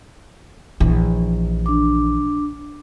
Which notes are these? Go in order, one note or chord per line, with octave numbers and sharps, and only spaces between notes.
A#1 E3
D4 D6